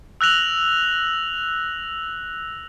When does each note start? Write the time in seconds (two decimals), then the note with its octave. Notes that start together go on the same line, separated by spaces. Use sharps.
0.21 E6 F#6 A#6 F7 F#7